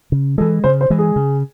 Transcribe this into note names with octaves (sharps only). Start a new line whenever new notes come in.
C#3
E3 G#3 A4
C#3 C5
C5
E3 G#3
G#4
C#3